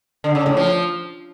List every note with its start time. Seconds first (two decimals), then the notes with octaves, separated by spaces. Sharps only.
0.24 D3
0.35 C#3
0.46 A2
0.57 F3